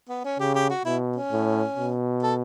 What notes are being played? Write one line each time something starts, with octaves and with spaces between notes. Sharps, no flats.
B3
C#4
C#3 G4
G4
F#4
B2 E4
C#4
A2
B2
A4